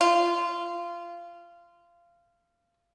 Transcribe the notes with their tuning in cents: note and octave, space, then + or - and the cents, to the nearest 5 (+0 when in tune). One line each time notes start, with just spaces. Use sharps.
F4 -20